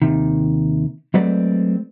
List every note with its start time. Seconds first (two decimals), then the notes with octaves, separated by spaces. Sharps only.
0.02 D#2 C3 D#3
1.14 F#3 G#3 A3 C4 B4 D5